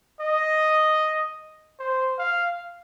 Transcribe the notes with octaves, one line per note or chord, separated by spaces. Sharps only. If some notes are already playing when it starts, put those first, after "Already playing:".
D#5
C5
F5